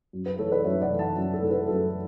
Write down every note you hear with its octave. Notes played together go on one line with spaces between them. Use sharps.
F#2
B4
E3 A3 A4 C#5
B4 D5
F#2 C#5 E5
D5 F#5
E3 A3
F#5 A5
F#2
A4
E3 A3
B4
F#2 A4